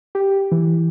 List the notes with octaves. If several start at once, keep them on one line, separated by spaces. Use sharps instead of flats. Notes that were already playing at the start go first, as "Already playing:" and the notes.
G4
E3